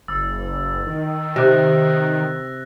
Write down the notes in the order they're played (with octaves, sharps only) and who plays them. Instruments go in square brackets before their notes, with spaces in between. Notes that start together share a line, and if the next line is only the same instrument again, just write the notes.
[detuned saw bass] F#1 [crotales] E6 A6
[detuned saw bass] D#3
[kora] C3 [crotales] F#6 A#6